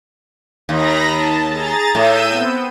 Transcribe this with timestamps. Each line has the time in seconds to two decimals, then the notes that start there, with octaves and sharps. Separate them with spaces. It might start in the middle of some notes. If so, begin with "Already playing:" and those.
0.69 D#2 A#5 B5 A#6
1.08 A5
1.49 G#4 A#5 A6
1.95 A2 E6 G6 D#7
2.29 B3 C4